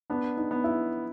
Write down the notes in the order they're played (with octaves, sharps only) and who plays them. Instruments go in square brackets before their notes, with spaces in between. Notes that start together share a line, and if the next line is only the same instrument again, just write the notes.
[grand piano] B3 [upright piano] D4
[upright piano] D#4
[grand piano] B3
[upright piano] E4